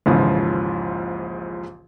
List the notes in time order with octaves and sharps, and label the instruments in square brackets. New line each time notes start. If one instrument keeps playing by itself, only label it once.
[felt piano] A#1 D#2 G#2 C#3 E3 F3